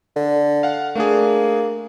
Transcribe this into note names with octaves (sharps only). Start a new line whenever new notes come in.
D3
F5 F#5
A3 A#3 D4 G#4